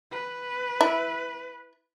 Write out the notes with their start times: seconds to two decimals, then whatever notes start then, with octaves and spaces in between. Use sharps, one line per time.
0.11 B4
0.81 E4